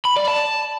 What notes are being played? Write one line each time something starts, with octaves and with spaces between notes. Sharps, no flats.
B5
D5
A5